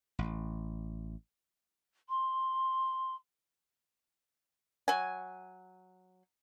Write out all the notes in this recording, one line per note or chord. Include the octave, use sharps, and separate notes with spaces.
A1
C6
F#3 G#5